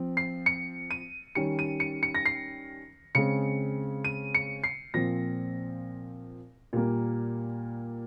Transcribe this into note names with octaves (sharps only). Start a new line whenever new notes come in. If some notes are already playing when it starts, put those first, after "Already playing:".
Already playing: F3 C4
C7
C#7
D#7
D#3 G3 C#4 C#7
D#7
C#7
C#7
A#6
C7
C#3 G#3 C4 C#7
D#7
C#7
C7
A#2 F3 C4 A#6
A#2 G3 A#3